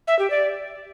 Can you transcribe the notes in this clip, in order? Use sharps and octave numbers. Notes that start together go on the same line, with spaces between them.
E5
G4
D5